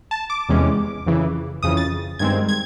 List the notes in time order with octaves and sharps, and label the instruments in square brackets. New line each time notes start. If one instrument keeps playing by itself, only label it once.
[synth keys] A5
D6
E2 C3 E3 G#3 C#4
F2 C#3 E3
F2 C#3 E3 D#6
A6
G2 D#3 G#3 C4 G#6
G#6